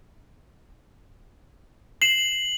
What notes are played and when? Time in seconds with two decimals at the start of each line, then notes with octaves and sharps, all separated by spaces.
2.02 C7 E7 F#7